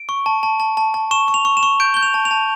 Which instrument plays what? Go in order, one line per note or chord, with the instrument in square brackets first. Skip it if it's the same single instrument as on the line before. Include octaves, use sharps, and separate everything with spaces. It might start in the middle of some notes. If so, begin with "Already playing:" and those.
Already playing: [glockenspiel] D7
C#6
A5
A5
A5
A5
A5
C#6 E7
C#6
F7
C#6
E7
C#6
G6 D7
G6 G7
F7
A5
F7
A5